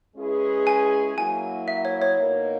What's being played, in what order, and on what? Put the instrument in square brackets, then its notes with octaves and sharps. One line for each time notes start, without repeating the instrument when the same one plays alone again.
[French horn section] G#3 C#4 E4 G#4 B4
[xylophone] G#5
[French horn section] F#3 A#3 E4 [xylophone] G#5
[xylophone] E5
C#5
C#5
[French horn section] B2 A#3 D#4 A#4